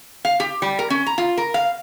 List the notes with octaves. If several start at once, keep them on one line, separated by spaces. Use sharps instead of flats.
F5
G4
G3
A#4
C#4
A#5
F4
A#4
F5